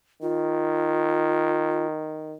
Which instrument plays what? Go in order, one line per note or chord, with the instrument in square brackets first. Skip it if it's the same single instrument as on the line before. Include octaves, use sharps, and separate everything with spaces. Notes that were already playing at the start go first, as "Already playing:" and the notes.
[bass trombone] D#3 [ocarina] F4